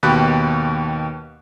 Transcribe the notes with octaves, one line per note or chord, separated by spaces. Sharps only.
D#2 B2 G4 B5 F#6